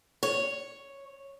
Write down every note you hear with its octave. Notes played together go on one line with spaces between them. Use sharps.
C#5